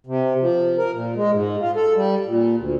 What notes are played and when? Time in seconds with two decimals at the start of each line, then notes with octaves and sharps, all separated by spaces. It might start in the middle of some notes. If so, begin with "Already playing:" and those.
0.07 C3
0.41 F3
0.78 A#4
0.93 A#2
1.16 G#3
1.31 G#2
1.60 F4
1.76 A4
1.96 G3
2.26 A#2
2.57 D2